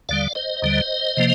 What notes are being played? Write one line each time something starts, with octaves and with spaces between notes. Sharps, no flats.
D#2 D3 G3 D5 F5
C5 D#5
D#2 D3 G3
C3 F3 A#3